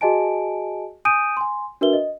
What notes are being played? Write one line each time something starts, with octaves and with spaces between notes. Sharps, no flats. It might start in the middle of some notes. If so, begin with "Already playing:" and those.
F#4 G#4 D#5 G#5 A5 D7
G#5 D#6 G6 D7 D#7
G#5 C6
D4 F#4 A#4 B4 E5 G7
D#5